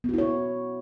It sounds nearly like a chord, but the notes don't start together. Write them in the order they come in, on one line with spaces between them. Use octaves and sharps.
B3 F#4 E4 C#5